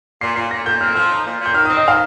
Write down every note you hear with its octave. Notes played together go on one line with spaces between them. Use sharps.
A#2 C7
A#2 C7
A#2 A#6
A#2 G6
C4 F6
F3 F6
D#4
A#2
A#2
G6
D#3 F6
C4 D#6
D#5
D#3 F5